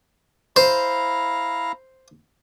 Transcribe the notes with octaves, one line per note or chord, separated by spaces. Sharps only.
E4 C5 F5 A#5